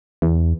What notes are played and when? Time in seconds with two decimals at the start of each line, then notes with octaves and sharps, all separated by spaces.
0.22 E2